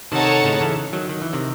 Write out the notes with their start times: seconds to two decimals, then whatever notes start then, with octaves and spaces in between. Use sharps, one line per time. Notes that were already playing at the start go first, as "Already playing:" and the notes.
0.12 C3 D#3 D#4 A4 C#5 F#5 A5
0.44 A2 C#3
0.61 C#3 E3
0.93 D#3 F#3
1.09 D#3
1.22 E3
1.33 C3 D#3